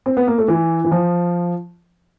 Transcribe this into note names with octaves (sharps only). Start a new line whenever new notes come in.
C4
B3
A#3
A3
E3
E3
F3